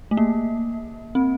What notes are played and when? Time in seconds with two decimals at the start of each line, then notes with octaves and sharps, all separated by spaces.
0.11 A3
0.17 A#3
1.15 C4